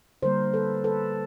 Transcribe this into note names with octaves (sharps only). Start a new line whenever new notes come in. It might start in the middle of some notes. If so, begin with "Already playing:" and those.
D3 G3 A#3 A#4 C5
A4 B4
A4 B4